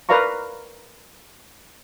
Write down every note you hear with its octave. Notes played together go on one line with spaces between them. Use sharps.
A#4 B4 D5 F5 A#5 C#6